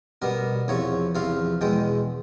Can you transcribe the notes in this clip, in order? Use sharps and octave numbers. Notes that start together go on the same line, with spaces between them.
B2 G3 B3 A#4
E2 C3 F3 C#5
E2 C3 F3 F5
E2 B2 G#3 G5